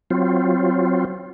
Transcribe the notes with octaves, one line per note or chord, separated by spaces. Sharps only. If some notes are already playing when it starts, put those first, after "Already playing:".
F#3 C4 F4